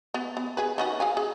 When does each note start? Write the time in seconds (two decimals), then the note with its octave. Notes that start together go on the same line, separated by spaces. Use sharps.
0.14 B3
0.37 B3
0.57 G#4 B4
0.78 D#3 C#4 F#4
1.00 G#4 F5 G#5
1.17 G#4